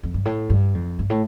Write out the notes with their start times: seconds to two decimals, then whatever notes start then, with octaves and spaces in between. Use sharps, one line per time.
0.03 F2
0.14 G2
0.25 A2
0.50 G2
0.74 F2
0.99 G2
1.10 A2